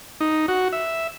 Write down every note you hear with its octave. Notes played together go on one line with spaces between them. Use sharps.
D#4
F#4
E5